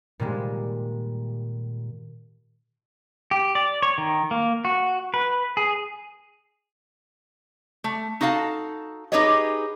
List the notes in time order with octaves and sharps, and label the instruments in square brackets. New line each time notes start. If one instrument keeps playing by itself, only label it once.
[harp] A#2 D#3 G3 G#3
[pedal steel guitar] G4
D5
C#5
D#3
A#3
F#4
B4
G#4
[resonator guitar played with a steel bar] A3
D#4 F#4 A4 F5 A5
D#4 G4 G#4 B4 C#5 D#5